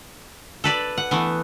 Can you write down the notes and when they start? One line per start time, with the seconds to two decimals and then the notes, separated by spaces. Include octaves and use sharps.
0.64 A4 B4 D5
0.98 F#5
1.11 E3 A3 B3